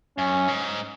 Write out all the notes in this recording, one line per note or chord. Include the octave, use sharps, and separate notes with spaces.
F#2 C#4
G#2